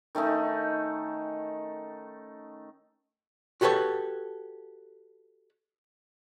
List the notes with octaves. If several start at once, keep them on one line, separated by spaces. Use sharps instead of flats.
D#3 A3 C#4 D#4
F#4 G4 A4 B4 C#5